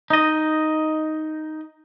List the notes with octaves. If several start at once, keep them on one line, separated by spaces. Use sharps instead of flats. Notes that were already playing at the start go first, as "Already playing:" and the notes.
D#4 D#5